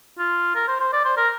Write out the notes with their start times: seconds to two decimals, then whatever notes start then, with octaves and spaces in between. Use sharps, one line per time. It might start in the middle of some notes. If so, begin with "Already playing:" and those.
0.19 F4
0.55 A#4
0.68 C5
0.80 C5
0.93 D5
1.05 C5
1.17 A#4